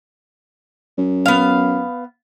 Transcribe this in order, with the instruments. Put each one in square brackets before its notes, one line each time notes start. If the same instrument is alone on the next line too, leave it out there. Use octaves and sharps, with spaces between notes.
[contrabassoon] F#2
[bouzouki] B3 F5